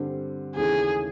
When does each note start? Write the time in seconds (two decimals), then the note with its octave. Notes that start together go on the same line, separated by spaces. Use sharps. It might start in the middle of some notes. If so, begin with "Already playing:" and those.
Already playing: G2 D3 G3 C4
0.55 D#2 C#3 E3 A3 G#4